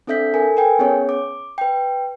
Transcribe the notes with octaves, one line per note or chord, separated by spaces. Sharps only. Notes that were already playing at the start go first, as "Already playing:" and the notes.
C4 D4 A4 E5 G6 B6
A4 A#4 G#5
A#4 B4 G5 G#5
B3 C#4 G#4 C#5
D6
B4 G5